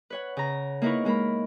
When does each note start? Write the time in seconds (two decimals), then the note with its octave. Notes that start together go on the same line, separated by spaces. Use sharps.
0.10 B4 C#5 F#5
0.37 C#3 A#5
0.82 A#3 D#4 E4 A#4 B4 C#6
1.05 G#3 A#3 A#4 B5